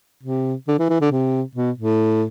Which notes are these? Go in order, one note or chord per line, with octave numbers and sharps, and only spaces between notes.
C3
D3
E3
E3
D3
C3
B2
A2